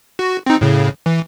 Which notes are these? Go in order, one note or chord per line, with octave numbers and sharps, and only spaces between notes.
F#4
C4 D#4
A2 C#3
E3